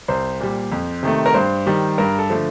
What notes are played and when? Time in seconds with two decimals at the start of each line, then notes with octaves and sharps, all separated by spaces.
0.08 C2 C5
0.40 A#2 G3
0.72 F2
1.03 C3 D#3 A3
1.26 A#4
1.34 G2 C5
1.66 D#3 G3
1.98 G2 A#4
2.19 A4
2.30 D3 F3 A3